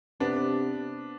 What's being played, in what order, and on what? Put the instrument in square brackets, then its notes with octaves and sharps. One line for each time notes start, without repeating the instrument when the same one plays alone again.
[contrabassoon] C3 [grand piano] B3 D4